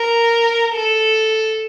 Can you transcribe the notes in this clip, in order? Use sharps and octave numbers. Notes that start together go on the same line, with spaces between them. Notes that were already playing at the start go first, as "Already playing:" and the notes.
Already playing: A#4
A4